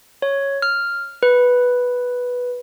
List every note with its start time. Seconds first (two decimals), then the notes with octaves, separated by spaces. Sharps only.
0.22 C#5
0.62 F6
1.23 B4